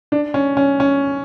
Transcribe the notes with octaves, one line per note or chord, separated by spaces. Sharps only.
D4
C#4
C#4
C#4